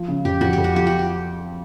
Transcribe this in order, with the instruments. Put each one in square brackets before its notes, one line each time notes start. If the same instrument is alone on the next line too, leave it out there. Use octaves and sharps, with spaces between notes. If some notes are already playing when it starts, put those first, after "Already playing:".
Already playing: [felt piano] F3
C#3
[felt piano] F2 [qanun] G4
[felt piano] F2 [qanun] F#4
[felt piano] F2 [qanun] G4
[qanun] F#4
[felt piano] F3 [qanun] G4
[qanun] F#4
G4